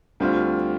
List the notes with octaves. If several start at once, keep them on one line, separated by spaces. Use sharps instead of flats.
D2 D3 G3 C4 F4